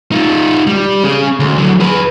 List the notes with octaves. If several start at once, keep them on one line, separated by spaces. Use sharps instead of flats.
D#4 F4
G3
C#4 G#4
D2
D3 F#3
G#4 B4